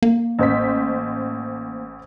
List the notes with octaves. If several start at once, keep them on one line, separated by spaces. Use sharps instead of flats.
A#3
A1 C5 B6